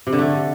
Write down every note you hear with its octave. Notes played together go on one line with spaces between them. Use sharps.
C3
D3
A3